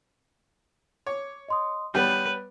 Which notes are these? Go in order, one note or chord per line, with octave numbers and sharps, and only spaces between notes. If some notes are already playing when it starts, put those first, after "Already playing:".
C#5 D6
D#5 C6 D#6
G3 B3 B4 C#5 G6